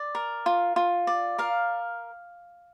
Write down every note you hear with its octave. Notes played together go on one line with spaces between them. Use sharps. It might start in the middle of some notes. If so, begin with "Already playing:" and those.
Already playing: D5
A#4
F4
F4
D5
A#4 F5